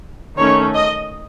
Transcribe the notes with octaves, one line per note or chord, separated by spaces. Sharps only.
D#3 A3 C#4 C#5
D#5